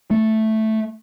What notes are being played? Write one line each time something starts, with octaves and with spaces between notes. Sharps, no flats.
A3